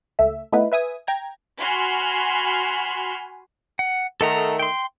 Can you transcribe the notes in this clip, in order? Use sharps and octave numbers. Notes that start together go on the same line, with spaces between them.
C#2 A3 E5
A3 B3 D#4 E4 B4
B4 E5 G#5 D#6
G5 A#5 G#6
F#4 G#5 B5 C6 F6
F#5
D#3 A3 A4 F#5 A#5
G5 C6